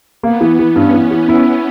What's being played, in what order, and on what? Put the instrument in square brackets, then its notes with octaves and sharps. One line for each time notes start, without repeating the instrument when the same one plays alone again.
[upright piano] A#3 [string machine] B3
[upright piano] E3
E3
[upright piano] G2 [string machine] C#4
[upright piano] E3
E3
E4